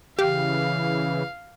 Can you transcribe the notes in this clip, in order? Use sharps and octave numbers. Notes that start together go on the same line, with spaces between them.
C#3 E3 G4 F5